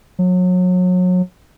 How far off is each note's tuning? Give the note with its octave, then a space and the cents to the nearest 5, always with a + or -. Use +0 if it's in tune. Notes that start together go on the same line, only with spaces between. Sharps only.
F#3 -30